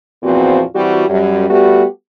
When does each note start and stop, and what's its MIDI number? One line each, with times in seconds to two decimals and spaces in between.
0.23 0.62 40
0.23 0.62 46
0.23 0.62 53
0.23 0.62 59
0.23 0.62 60
0.23 0.62 66
0.75 1.03 52
0.75 1.03 55
0.75 1.03 60
0.75 1.03 66
1.09 1.47 42
1.09 1.47 55
1.50 1.85 55
1.50 1.85 57
1.50 1.85 59
1.50 1.85 66
1.50 1.85 67